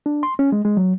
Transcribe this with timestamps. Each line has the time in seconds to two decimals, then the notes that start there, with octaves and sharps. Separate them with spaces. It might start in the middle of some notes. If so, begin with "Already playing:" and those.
0.06 D4
0.23 C6
0.39 C#4
0.52 G#3
0.65 G#3
0.77 F#3